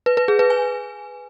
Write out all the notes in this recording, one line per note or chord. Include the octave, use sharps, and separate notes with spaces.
B4
B4
G#4
B4
G#5